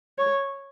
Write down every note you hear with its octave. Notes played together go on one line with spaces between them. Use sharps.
C#5